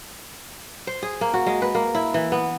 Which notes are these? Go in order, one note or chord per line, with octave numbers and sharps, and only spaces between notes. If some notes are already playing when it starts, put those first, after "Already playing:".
C5
G#4
A#3
F#4
G#3
B4
A#3
E4
E3
B3